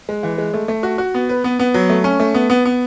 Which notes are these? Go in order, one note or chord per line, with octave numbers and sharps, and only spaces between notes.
G#3
E3
G#3
A3
A3
F#4
F#4
B3
B4
B3
B3
F#3
A3
C#4
A3
B3
B3
B3